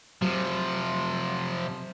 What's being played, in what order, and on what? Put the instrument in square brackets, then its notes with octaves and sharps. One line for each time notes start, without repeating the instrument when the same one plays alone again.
[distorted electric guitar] C3 F3 [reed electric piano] F#3